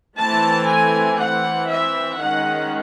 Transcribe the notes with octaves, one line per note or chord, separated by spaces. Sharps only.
E3 A3 C4 A5
G#5
E3 C4 F#5
E5
D#3 G#3 C#4 F#5